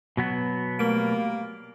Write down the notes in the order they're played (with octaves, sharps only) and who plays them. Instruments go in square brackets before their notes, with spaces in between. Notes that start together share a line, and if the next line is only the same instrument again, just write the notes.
[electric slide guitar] B2 F#3 B3
[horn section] G3 A#3 [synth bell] A3 D7